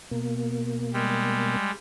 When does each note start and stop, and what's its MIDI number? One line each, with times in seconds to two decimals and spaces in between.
0.11 1.56 47
0.11 1.56 58
0.94 1.71 55
0.94 1.71 56